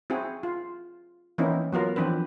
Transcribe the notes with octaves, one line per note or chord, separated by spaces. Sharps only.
C4 E4 F#4 G#4
F4
E3 A#3 C4 C#4 D#4 E4
F#3 B3 F4 A#4
E3 F3 C4 D4 B4